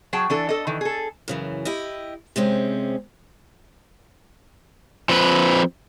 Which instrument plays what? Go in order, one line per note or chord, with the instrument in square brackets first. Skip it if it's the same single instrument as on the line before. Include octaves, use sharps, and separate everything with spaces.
[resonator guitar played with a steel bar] F#3 G#4 G5 A5
E3 D4 A4
A4 D#5
D#3 E3
G#4 A4
[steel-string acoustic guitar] F#2 C#3 E3
E4 G4 D#5
C3 G#3 C4 C#4
[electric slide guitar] F3 C4 B4